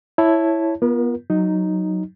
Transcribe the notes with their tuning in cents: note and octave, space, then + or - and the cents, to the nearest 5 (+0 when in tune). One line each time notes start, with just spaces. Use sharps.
E4 +0 C#5 +0 A5 +0
B3 -25 F4 -20 A#4 +30
F#3 +0 D#4 +0